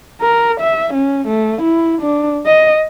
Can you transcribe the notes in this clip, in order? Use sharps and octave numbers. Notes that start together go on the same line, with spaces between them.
A#4
E5
C#4
A3
E4
D4
D#5